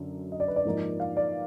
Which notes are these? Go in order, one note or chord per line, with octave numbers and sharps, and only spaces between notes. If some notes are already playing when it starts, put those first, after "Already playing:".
Already playing: F#2 D3
D#5
D5
B4
D5
G#2 F3 A#3 D#4
F5
D5